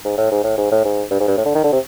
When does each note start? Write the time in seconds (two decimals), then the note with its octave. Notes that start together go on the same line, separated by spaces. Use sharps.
0.05 G#2
0.17 A2
0.31 G#2
0.44 A2
0.58 G#2
0.71 A2
0.85 G#2
1.11 G2
1.20 G#2
1.28 G2
1.37 A2
1.45 D3
1.55 D#3
1.64 D3
1.72 C3